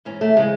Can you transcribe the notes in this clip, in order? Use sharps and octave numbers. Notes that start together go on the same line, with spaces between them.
G#2 E3 C#4
A3
C#3 E3 G#3